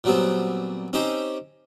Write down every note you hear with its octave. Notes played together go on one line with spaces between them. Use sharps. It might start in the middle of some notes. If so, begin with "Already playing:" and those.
A#2 F#3 G3 B3 C4
C4 C#4 D#4 G4 C5